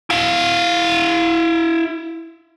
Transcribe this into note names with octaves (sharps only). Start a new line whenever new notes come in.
E4 F5